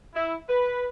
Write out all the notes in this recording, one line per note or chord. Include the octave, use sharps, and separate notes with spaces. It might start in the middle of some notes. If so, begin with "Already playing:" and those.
E4
B4